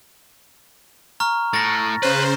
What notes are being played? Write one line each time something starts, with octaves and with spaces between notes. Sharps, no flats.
A#5 C#6 F6
A2 A6 A#6
C#3 B4 C5